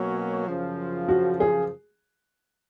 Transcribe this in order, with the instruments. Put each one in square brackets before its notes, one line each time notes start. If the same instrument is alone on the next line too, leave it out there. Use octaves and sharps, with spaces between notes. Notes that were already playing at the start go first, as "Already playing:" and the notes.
Already playing: [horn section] B2 F#3 A#3 C#4 F#4
F#2 C#3 F3
[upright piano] F#4
G#4